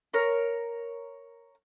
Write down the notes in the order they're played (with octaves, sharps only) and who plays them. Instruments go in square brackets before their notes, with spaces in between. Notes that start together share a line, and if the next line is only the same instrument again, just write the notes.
[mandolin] A#4 C#5